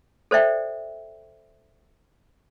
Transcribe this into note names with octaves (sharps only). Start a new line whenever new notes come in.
A4 C5 D5 E5 G5